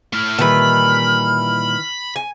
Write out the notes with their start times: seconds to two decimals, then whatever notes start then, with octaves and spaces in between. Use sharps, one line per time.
0.13 A3 E4 F6
0.39 A#2 D#3 E3 G3 B4 A5 B5
2.16 G#5